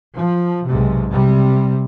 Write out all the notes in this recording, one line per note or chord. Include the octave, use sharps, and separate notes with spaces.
F3
B1 G#2 C3
C3 G3